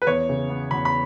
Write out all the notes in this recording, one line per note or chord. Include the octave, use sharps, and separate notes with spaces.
B4
E2 C#5
C#3
B3
E2 B5
B5